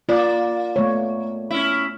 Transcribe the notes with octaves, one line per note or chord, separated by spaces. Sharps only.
A#3 F4 D5
A3 B3 C#5
C#4 E4